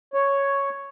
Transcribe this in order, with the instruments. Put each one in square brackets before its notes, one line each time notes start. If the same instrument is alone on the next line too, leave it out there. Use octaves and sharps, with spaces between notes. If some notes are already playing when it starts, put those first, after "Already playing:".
[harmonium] C#5